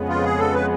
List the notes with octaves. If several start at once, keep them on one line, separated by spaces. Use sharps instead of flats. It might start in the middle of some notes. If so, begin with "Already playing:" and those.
Already playing: F2 C#3 G#3 B3
F4
G#4
A4
B4